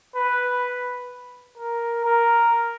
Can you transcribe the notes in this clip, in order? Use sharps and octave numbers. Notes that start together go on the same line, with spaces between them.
B4
A#4
A#4